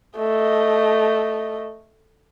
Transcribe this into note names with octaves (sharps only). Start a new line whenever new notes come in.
A3 D#5